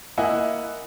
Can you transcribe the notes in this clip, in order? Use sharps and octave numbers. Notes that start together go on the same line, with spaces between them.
A#3 E4 D#5 E5 F#5 G#5